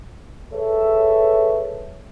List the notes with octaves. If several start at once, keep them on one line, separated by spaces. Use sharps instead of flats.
G#4 A4 B4 C#5 E5